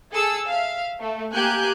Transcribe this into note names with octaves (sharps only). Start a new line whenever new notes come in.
G#4 A4 A5 E6
E5 F5
A3
A#3 G4 G#5 F#6 G6